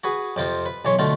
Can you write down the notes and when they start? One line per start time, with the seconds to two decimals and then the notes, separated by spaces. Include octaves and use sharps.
0.04 F#4 G#4 B4
0.36 F2 C3 F4 C5
0.66 B4
0.85 B1 E3 C#5 C6
0.99 D2 B2 A3 F4